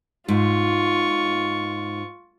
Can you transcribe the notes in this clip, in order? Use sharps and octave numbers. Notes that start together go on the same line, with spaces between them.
G#2 F4 C#6